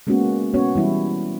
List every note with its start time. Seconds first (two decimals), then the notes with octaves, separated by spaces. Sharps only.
0.07 G#3 A#3 B3 C#4 F#4
0.54 B3 C#4 F#4 C#5
0.75 E3 G3 E4